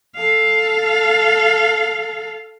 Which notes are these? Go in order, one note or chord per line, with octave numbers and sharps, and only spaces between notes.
A4 F5